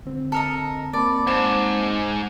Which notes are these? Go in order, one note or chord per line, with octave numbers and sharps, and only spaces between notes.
D3 C4
A4 A#4 D#5
A#3 C4 A#4 D5 A5 B5
G#2 C5 A5 D6 E7